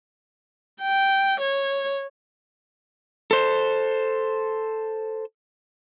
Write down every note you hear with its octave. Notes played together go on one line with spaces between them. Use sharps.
G5
C#5
A4 C5